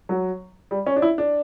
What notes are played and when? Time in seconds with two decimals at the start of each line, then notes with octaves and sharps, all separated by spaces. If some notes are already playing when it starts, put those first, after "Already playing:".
0.09 F#3
0.71 G3
0.86 C#4
0.96 D4
1.02 E4
1.18 D4